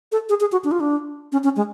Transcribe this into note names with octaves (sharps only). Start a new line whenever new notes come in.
A4
G#4
G#4
F#4
D4
F4
D4
C#4
C#4
G#3